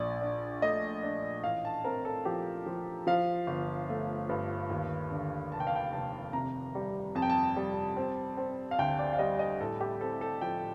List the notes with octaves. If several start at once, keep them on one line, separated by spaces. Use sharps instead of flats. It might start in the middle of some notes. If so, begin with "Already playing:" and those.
Already playing: A#1 D5
D4
A3 D#5
D4
A1 F5
A5
C4 A#4
A4
F3 G4
F3
F3 F5
G1
A3
G2
D#2
D3
F1 A5
G5
F5
G5
F1 A5
C3 A#5
G3
F2 A5
G5
A5
G3
C4
C4
F5
D2 G5
D5
F5
G3 D#5
D#5
A2 A4
G4
C4 A4
A4
F3 G5